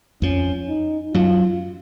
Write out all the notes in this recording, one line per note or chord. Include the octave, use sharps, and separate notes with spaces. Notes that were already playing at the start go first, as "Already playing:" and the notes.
F2 F3 C#4
D#4
F#2 F#3 F4